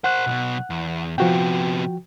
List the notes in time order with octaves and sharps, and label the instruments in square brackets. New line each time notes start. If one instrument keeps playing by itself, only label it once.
[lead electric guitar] A#4 C5 [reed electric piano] F#5 F#6
[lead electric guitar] B1 B2
E2
[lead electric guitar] C3 B3 [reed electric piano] F3 F#4 G5